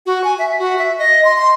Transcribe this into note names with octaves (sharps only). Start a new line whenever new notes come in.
F#4
G#5
E5
F#4
E5
D#5
C6
C6